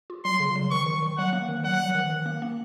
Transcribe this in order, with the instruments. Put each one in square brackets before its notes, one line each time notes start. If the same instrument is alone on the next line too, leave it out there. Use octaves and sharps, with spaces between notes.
[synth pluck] F4
[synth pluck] F#3 [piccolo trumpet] C6
[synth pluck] C#3
F#3
[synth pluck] D#3 [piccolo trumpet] C#6
[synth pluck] D#3
D#3
[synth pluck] F#3 [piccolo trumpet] F#5
[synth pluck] A#3
D#3
[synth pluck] F#3 [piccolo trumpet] F#5
[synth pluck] F#3
D#3
D#3
A#3
A#3